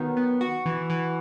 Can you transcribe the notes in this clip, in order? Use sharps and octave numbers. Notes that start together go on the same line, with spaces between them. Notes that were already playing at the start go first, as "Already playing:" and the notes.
Already playing: D#3 F#3 B3
B3
F#4
E3
E3